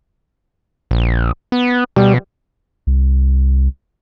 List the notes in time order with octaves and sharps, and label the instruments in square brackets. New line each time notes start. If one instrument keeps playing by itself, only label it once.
[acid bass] A#1
B3
[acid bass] B2 [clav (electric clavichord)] G3
[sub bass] C2